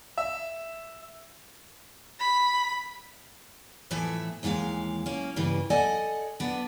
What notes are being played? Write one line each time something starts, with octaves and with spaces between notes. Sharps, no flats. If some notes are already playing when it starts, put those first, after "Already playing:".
E5
B5
F2 A2 E3 A3 E5 G#5
D#2 E3 G#3 C#5 F5
A#3 C#4
G2 C#3 E3 A#3
A4 D5 D#5 F#5 G#5
B3 D4